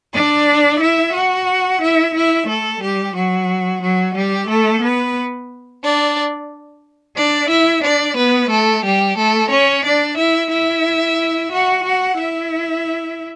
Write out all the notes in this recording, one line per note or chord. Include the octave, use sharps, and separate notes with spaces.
D4 D5
E4 E5
F#4 F#5
E4 E5
E4 E5
A3 A4
G3 G4
F#3 F#4
F#3 F#4
G3 G4
A3 A4
B3 B4
D4 D5
D4 D5
E4 E5
D4 D5
B3 B4
A3 A4
G3 G4
A3 A4
C#4 C#5
D4 D5
E4 E5
E4 E5
F#4 F#5
F#4 F#5
E4 E5